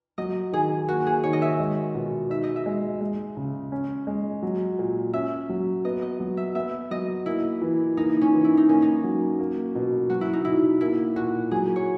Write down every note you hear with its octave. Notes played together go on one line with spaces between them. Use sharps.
F#3 D#5
D#3 G#4
A#3 F#4
G#4
D#3 C#5
D#5
E5
G#3
B2
D#4 E5
D#5
E5
G#3
G#3
C#3
C#4
G#3
F#3
A#2
C#4 E5
F#3
B3 D#5
D#5
F#3
E5
B3 E5
F#3 D#5
A#3 E4
E3
A#3 D#4
C#4
E3
E4
D#4
A#3 C#4
D#4
F#3
A#3
B2
F#3 F#4
E4
D#4
B2 E4
A#3 E4
A#2 F#4
F#3 G#4
C#5